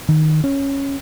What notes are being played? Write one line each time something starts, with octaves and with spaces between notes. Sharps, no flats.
D#3
C#4